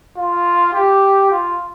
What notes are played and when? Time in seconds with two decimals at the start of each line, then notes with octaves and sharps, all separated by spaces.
0.17 F4
0.73 G4
1.31 F4